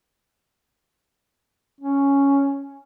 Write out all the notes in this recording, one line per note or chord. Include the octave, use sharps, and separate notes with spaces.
C#4